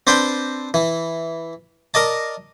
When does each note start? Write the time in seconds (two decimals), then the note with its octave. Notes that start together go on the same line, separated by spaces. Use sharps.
0.07 C4 D4 B4 C5 G5
0.74 E3
1.94 A#4 D5 D#5 A5